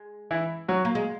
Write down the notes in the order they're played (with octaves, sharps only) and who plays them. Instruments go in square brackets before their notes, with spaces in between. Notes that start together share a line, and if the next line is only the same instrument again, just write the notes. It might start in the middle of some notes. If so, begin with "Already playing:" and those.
Already playing: [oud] G#3
[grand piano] E3 E4
F#3 F#4
[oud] A#3
G#3